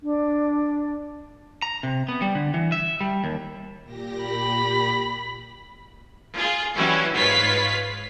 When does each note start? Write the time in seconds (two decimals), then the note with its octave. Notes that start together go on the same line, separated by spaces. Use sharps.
0.01 D4
1.62 A#5
1.83 C3
2.08 B3
2.22 G3
2.35 D3
2.54 E3
2.72 E5
3.01 G3
3.24 D#2
3.84 A#2 G4 A#6
4.23 B5
6.34 F4 G#4
6.75 E3 F#3 G3 C#4 E4 F#4
7.14 G#2 F4 B4 C#5 B6 C7